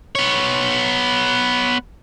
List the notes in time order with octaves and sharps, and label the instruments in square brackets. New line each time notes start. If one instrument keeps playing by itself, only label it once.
[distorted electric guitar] B3 C#5